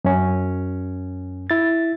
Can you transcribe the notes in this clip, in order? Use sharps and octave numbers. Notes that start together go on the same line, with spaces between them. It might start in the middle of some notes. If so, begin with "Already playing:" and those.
F#2 C#4
E4 A6